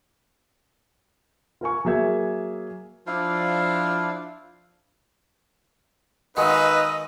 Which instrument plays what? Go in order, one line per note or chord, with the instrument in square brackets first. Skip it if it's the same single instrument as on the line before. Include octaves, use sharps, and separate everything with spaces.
[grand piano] F4 A#4 G#5 C#6
F#3 A#3 G#4 E5 G#6
[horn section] F3 D4 [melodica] E4 F5
[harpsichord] D#3 G#3 F#4 [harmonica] D#4 F4 E6 [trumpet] B4 [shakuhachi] D#5